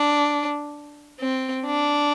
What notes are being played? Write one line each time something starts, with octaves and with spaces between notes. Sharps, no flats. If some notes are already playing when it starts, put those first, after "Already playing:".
Already playing: D4
C4
D4